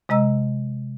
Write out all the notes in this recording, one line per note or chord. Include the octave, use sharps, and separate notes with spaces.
C3 G#3 D#5 A#5 E6